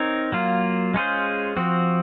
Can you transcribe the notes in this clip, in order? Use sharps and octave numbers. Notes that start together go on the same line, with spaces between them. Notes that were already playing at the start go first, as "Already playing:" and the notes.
Already playing: C4 D#4 A#4 C#5
F#3 A#3 F4
G#3 C#4 F4 G#4 C5
F3 C4 F#4